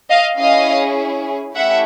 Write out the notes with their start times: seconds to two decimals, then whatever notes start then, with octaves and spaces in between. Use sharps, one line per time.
0.09 D#5 F5
0.38 C#4 E4 G#4 D#5 F5
1.54 A3 C#4 E4 G4 E5 F#5